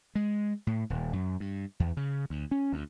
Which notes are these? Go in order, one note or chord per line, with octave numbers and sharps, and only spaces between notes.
G#3
A2
D#1
F#2
G2
E2
C#3
D2
C#4
D2